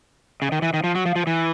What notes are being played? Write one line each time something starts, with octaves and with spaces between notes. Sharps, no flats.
C#3
D#3
E3
D#3
F3
F#3
F3
F3
E3